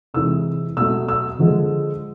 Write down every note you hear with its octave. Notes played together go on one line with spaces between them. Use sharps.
C3 E3 G#3 E6
B2 F#3 A3 E6
E6
D3 F3 G#3